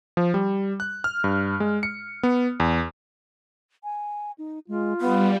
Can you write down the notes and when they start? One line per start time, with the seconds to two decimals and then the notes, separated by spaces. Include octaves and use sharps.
0.17 F3
0.34 G3
0.80 F#6
1.04 F6
1.24 G2
1.60 G#3
1.83 C#7
2.23 B3
2.60 E2
3.84 G#5
4.38 D#4
4.68 G#3 F4
5.01 G3 B3 F5